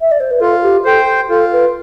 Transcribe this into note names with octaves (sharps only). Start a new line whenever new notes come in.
E5
D5
C5
B4
F4 A4
G4
A4 C5 G5
F4 A4
B4